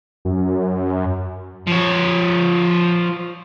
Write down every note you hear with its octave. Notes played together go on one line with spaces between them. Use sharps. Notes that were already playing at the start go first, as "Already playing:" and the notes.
F#2
F3 C#5